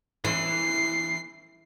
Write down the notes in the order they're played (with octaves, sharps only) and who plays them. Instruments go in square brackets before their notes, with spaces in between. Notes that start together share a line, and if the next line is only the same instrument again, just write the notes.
[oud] E3 [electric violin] C7